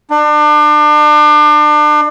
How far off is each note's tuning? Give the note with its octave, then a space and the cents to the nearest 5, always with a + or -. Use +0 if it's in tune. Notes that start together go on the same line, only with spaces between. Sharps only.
D4 +35